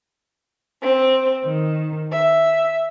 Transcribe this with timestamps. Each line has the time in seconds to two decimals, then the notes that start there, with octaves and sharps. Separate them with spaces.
0.81 C4
1.47 D#3
2.11 E5